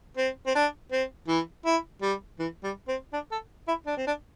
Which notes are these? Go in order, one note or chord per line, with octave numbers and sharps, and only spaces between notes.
C4
C4
D4
C4
E3
E4
G3
E3
G3
C4
D4
A4
E4
D4
C4
D4